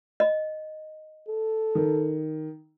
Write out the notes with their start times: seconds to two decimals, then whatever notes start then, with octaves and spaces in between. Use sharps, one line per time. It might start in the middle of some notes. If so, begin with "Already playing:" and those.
0.20 D#5
1.28 A4
1.75 D#3